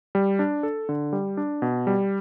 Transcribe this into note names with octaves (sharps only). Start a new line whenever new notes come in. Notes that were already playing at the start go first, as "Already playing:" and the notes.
G3
D4
A4
D3
G3
D4
B2
G3